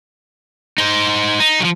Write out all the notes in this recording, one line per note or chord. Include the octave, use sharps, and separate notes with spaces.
D#4 C5
D#4
F3 F#3